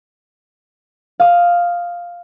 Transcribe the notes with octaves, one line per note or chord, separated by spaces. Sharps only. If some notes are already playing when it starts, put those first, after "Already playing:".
F5 D#6